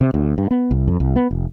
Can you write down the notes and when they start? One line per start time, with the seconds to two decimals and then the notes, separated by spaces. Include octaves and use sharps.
0.01 C3
0.14 D2
0.38 G2
0.51 B3
0.71 C2
0.88 F2
1.00 C2
1.16 B3
1.31 F1